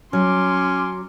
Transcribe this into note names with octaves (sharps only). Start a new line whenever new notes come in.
F#3 C#4 C6 D6